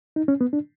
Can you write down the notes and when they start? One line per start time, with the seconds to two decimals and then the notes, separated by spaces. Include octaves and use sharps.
0.16 D#4
0.28 C#4
0.41 B3
0.53 D4